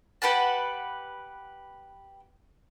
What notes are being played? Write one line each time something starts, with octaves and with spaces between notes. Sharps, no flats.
G4 B4 F#5 A5